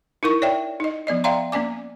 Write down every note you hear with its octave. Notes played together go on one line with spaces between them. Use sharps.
D#4 E4 A#4 C#6
C#5 D5 E5 G5
D#4 D#5
F3 B3 D5 D#5
D5 E5 F5 G5 A#5 C6
A#3 C#4 D5 G#5 D6